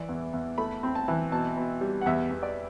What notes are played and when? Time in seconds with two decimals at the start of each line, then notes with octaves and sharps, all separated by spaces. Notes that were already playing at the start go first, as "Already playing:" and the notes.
Already playing: E3 D5
0.09 E2
0.33 E2
0.58 A3 B5
0.83 C4
0.95 A5
1.08 E3
1.32 B2 A5
1.57 B2
1.81 G3
2.01 F#5
2.06 E2 E5
2.31 E2
2.43 D5